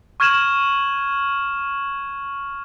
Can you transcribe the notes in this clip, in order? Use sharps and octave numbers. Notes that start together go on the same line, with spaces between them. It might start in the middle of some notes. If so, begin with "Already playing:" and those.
C#6 F6 G#6 D#7 E7 F#7